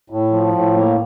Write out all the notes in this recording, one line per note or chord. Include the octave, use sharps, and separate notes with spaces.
A2
F3
A2
A#3